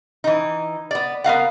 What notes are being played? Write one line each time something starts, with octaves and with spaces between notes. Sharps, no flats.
E3 D#4
B3 D5
B3 A#4 F5 F#5